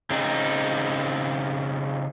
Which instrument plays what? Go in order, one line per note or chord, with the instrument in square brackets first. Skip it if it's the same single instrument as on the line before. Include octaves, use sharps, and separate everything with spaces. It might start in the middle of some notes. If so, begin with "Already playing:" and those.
[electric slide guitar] C#3 C4 D#4